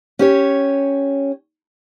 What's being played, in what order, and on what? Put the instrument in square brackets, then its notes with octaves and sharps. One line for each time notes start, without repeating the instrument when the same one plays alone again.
[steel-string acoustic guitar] C#4 G4 C#5